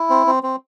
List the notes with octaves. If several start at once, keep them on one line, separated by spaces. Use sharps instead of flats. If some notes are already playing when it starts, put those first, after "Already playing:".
Already playing: E4
C4
C4
C4